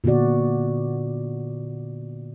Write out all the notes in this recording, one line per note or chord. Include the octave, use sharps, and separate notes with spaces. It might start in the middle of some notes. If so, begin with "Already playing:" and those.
A#2 D3 B3 F#4 D5